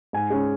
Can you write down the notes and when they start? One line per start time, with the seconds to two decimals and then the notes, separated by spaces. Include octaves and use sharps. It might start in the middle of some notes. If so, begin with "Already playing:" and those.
0.13 G#2 G#5
0.30 G#3 C#4